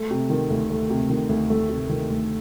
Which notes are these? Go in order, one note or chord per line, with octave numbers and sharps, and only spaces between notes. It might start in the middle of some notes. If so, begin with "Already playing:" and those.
Already playing: A3
C3
D#3
D2
A3
C3
D#3
D2
A3
C3
D#3
D2